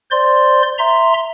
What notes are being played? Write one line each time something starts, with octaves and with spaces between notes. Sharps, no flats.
C5 D5 C6
E5 A#5 C6